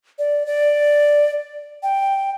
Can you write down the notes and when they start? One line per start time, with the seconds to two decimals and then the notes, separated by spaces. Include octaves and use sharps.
0.19 D5
0.46 D5
1.83 G5